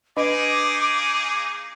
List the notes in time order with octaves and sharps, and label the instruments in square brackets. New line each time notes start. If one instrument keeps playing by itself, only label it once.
[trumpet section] A#3 D#4 G#4 [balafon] D4 B4 D#5 [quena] D6